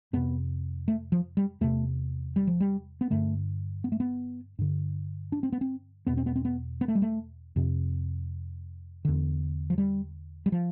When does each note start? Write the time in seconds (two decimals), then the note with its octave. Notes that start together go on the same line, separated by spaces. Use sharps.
0.13 F2 C3 B3
0.88 A3
1.12 F3
1.37 G3
1.61 E2 C3 A3
2.36 G3
2.47 F3
2.60 G3
3.01 B3
3.10 G2 D3 A3
3.84 B3
3.92 A3
4.00 B3
4.59 G2 D3
5.32 D4
5.43 C4
5.52 B3
5.61 C4
6.07 E2 B2 B3
6.17 C4
6.26 B3
6.36 C4
6.45 B3
6.81 B3
6.88 A3
6.95 G3
7.02 A3
7.56 F2 C3
9.05 E2 D3
9.70 F3
9.78 G3
10.46 G3
10.52 F3